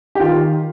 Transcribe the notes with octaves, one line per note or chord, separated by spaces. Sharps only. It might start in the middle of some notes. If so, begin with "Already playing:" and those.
G4
D#3 F4